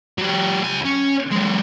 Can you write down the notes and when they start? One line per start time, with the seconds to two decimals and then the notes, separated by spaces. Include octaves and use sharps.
0.18 F#3 G4
0.64 C#2 G#5
0.85 C#4
1.31 F#3 G#3